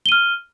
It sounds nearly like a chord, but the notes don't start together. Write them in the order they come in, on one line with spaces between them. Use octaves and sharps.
G7 D#7 F6